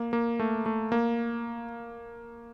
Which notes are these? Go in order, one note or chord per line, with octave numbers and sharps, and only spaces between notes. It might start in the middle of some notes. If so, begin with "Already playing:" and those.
Already playing: A#3
A#3
A3
A3
A#3